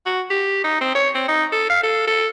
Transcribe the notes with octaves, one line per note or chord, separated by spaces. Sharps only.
F#4
G4
D#4
C4
C#5
C4
D#4
A4
F5
A4
A4